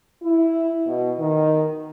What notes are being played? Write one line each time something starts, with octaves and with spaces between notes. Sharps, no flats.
E4
B2
D#3